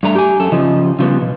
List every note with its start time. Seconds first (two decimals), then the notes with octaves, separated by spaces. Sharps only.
0.03 G2 A3 A#5
0.15 G4 G#5
0.40 F#2 A4
0.52 C#3 F3 D#5
0.99 C#3 F3 G3 B3
1.21 B2